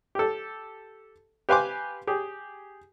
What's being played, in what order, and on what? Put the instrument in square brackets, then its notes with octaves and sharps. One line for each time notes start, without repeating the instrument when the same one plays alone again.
[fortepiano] G4 A4
G4 B4 F5 G#5 C6 D6
G4 G#4